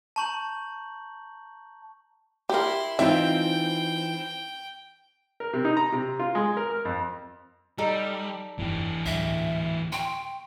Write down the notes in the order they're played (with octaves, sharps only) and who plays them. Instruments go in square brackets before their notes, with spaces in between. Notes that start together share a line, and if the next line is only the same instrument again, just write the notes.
[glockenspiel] A5 A#5 C#6 G6 F#7
[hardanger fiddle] E4 C6 [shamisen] G4 A#4
[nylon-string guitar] E3 D#4 F4 [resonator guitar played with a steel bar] C4 [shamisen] E5 [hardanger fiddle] G5
[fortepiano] A#4
C3
D#4
A#5
C3
F4
G#3
A#4
F6
F2
[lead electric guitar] G3 [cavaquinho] D#4 A4 D5
[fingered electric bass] G1 F2 [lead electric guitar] E3 G4
[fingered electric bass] D2 A2 F#3 [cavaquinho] G#4 [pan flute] E5
[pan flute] G5 [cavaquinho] C6 C#6